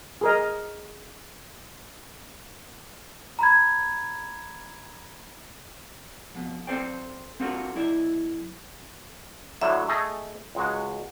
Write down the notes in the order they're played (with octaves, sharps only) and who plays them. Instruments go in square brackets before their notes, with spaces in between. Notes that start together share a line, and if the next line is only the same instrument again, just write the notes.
[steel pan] G#4 A#4 D#5
[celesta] A#5 B5 G#6
[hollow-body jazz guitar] F2 B2
C4 E4 A4 C5 D5 G5
C4 D4 F4 F#4 A4 A#4
B1 E4 D5 E5
[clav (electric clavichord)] A2 D3 F#3 [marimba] E5
[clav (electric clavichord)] A3 G#4 D#5
C#2 G#3 F#4